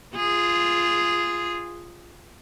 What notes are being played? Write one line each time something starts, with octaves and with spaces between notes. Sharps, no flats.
F4 G#4